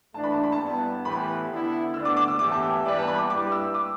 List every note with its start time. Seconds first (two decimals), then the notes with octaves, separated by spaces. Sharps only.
0.14 E3 A3 D4 A5
0.24 B5
0.33 A5
0.43 B5
0.52 A5
0.59 G2 G3 B3 E4
1.05 A2 E3 B3 G4 B4 B5
1.50 D3 B3 E4
1.94 D2 D3 B3 D4 E6
2.05 D6
2.17 D6
2.28 E6
2.39 A2 E3 B3 G4 D6
2.51 A5
2.63 G5
2.73 E5
2.84 E3 G3 B3 G4 B4 D5
2.99 A5
3.07 B5
3.18 D6
3.30 G2 G3 E4 G4 B4 D6
3.52 E6
3.74 D6